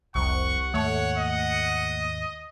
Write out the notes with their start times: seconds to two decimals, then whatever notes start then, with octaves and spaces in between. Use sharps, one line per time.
0.15 F1 C2 F2 F#5 C#6
0.74 D#2 G#2 A3 C#5
1.18 D#5